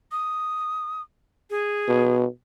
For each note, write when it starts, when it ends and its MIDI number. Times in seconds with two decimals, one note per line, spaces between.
0.12 1.01 87
1.50 2.15 68
1.88 2.25 47